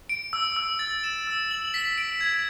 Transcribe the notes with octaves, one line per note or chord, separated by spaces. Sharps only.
D7
E6
E6
A6
E7
E6
F#7
B6
D7
G#6